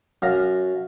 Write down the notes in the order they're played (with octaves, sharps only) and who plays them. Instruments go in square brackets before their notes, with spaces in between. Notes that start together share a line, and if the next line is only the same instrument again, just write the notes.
[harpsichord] F#2 F5 A#5